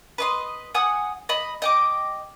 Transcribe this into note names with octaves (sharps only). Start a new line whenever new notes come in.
B4 D#5 C6
F#5 G#5 D#6
D#5 B5
D#5 G5 D6